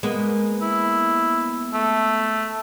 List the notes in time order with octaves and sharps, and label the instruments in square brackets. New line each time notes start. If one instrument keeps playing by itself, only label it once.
[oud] G#3 A#3 B3
[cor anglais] E4
A3